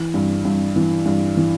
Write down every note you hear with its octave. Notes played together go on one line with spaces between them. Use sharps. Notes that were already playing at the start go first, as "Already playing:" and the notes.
Already playing: E3
G2
G2
E3
G2
E3